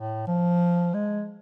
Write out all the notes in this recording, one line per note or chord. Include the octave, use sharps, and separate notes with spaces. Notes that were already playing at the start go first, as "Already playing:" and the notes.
Already playing: A2
F3
G#3